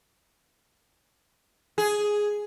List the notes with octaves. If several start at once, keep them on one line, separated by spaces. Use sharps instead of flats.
G#4